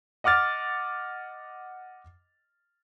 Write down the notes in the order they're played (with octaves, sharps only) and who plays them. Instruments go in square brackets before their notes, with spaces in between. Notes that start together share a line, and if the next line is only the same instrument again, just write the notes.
[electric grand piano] D#5 F#5 D6 F6 A6